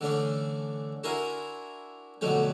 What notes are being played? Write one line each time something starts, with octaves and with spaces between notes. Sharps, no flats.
D3 E3 A3 C#4 D4
D4 E4 F#4 A#4 G#5 C6
F2 B2 D3 F#3 A3 G5